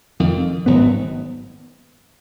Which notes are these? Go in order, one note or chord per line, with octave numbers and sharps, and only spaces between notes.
F1 F2 D#3
G#1 G#2 F#3 B3